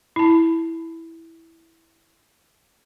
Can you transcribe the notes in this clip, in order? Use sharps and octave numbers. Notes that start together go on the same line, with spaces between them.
E4 A5